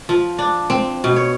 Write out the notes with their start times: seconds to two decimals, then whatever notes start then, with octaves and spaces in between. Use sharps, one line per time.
0.09 F3
0.39 D4
0.70 C4
1.04 B2
1.16 C#5